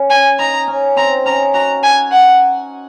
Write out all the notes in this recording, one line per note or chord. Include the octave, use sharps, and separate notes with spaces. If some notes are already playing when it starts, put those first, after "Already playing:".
Already playing: C#4
G#5
D#4 A#5
C#4
C4 A#5
C#4 A#5
F#4 A#5
G#5
F#5